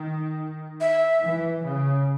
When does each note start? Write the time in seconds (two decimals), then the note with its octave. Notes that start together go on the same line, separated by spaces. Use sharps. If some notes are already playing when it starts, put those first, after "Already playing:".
Already playing: D#3
0.81 E5
1.22 E3
1.63 C#3